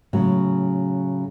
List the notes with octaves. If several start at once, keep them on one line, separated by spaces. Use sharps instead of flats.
A2 C#3 F#3